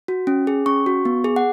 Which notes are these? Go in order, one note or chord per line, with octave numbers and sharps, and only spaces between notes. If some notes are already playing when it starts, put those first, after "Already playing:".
F#4
C#4
G#4
C#4 C#6
F#4
B3
G#4
F#5